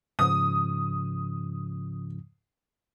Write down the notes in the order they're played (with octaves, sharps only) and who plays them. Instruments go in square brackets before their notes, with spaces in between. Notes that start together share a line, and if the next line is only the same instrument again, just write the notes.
[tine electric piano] G#2 C#3 F3 [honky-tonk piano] D#6